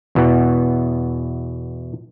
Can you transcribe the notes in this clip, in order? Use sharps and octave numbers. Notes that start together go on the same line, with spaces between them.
E2 B2 E3 B3